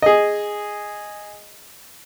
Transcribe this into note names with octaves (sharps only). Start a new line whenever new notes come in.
G#4 D#5